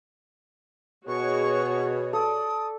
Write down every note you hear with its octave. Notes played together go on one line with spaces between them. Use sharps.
B2 F#4 G#4 C#5 C#6
A4 D5 D#6